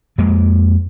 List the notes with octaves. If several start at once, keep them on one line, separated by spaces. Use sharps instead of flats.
F2 G#3 A#3